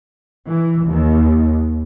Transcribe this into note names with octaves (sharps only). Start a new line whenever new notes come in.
E3
D#2